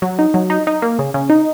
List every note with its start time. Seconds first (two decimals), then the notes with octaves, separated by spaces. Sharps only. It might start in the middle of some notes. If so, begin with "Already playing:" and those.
0.02 F#3
0.19 D#4
0.34 F#3
0.50 D#4
0.67 D#4
0.82 A#3
0.99 C#3
1.14 C#3
1.30 D#4